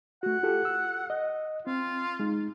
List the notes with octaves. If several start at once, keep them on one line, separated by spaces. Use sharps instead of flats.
A3 F#4 F#5
F4 G4 A4
E6
D#5
C4 F4
G#3 D#4